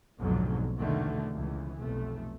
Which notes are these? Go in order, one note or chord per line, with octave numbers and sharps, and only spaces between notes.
F1 B1 F2 G#2 D3 F#3
A#1 E2 B2 D3 D#3 A3
C#2 E3
F1 B1 A3